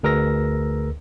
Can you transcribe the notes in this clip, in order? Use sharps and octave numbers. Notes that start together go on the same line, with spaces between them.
D2 G#4 A#4 B4 E6 A#6